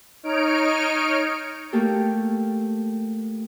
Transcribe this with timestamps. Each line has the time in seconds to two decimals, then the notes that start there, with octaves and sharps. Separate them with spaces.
0.23 D#4 C#5 F6 D7
1.73 A3 A#3 G4 A4